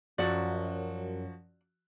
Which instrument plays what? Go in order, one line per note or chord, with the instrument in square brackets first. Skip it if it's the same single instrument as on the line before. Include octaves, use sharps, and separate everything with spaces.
[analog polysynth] F#2 [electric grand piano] F3 F#4 [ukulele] D5 F#5